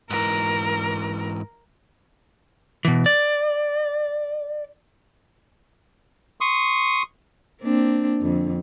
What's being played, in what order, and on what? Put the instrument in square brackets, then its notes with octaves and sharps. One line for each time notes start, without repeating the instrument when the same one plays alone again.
[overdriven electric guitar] G#2 E3 [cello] A#4
[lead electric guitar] B2 E3
D5
[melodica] C6 C#6 D#6
[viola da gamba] A#3 C4 D4
F2 D3